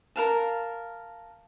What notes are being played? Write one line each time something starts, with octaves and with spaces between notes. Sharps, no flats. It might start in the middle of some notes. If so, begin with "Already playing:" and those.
A#4 F5 A5